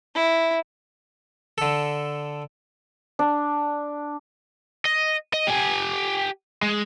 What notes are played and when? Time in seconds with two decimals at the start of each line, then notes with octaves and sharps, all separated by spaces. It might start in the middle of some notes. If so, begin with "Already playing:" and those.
0.15 E4
1.58 D3 A4
3.19 D4
4.85 D#5
5.33 D#5
5.47 G4 G#5
6.62 G#3